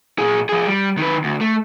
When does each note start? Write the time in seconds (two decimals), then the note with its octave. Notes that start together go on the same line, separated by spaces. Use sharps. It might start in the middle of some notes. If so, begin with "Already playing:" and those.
0.18 A#2 G#4
0.49 F3 G#4
0.67 G3
0.98 D#3 B4
1.24 D2
1.41 A3